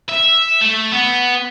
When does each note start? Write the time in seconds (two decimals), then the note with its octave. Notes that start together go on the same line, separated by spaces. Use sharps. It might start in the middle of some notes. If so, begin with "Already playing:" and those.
0.09 E5
0.61 A3
0.92 B3